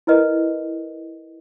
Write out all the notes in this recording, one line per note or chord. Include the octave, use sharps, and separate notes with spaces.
E4 A#4 B4 D#5